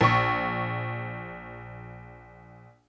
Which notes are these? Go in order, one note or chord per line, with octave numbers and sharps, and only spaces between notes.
A#1 C#6